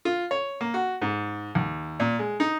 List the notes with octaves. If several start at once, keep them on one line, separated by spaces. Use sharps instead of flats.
F4
C#5
A#3
F#4
G#2
D#2
A#2
G#3
D#4